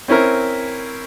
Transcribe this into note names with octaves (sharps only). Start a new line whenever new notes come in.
C4 C#4 E4 A#4